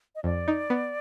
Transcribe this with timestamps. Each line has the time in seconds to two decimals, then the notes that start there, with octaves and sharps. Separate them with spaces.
0.15 D#5
0.24 F2 D5
0.48 D#4
0.70 B3